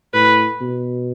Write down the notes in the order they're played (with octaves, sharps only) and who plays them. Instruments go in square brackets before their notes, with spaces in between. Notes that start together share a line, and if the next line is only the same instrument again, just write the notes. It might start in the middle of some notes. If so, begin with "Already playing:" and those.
[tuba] A2 [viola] B4
[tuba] B2